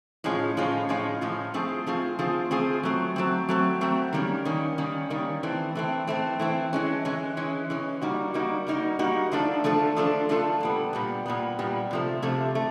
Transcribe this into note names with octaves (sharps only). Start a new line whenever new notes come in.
A2 F3 G#3 C#4 F4
A2 F3 G#3 C#4 F4
A2 F3 G#3 C#4 F4
A2 F3 G#3 C#4 F4
F3 A3 C4 F4 G#4
F3 A3 C4 F4 G#4
F3 A3 C4 F4 G#4
F3 A3 C4 F4 G#4
F#3 A3 C4
F#3 A3 C4
F#3 A3 C4
F#3 A3 C4
D#3 G3 A#3 C#4
D#3 G3 A#3 C#4
D#3 G3 A#3 C#4
D#3 G3 A#3 C#4
E3 A3 C4
E3 A3 C4
E3 A3 C4
E3 A3 C4
E3 G#3 C#4
E3 G#3 C#4
E3 G#3 C#4
E3 G#3 C#4
G3 A#3 D#4 F#4
G3 A#3 D#4 F#4
G3 A#3 D#4 F#4
G3 A#3 D#4 F#4
F3 A3 D4 F4 A4
F3 A3 D4 F4 A4
F3 A3 D4 F4 A4
F3 A3 D4 F4 A4
A#2 G3 B3
A#2 G3 B3
A#2 G3 B3
A#2 G3 B3
C3 F3 A3
C3 F3 A3
A3